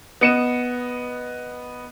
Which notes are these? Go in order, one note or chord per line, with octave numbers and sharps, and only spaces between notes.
B3 D#5 C#7 D#7 E7